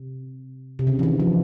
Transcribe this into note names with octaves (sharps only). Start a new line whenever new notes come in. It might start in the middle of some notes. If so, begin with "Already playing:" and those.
Already playing: C3
C3
C#3
E3
D#3
F3